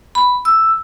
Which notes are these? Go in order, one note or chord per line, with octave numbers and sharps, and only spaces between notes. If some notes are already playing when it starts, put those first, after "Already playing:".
B5
E6